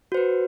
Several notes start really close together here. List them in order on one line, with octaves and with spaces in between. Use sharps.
F#4 C5 B4